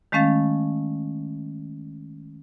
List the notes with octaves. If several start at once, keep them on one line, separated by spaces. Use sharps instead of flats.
D#3 G#3 A3 C#4 F5 A6